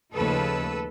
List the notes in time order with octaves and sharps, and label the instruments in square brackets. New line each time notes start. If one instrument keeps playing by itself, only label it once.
[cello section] D#2 C#3 F3 A3 A4 B4